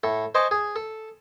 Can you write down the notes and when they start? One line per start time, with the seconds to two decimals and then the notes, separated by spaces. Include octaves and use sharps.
0.03 A2 A4
0.35 C5 D#5 G#5 A5 C#6 D6
0.51 G#4
0.76 A4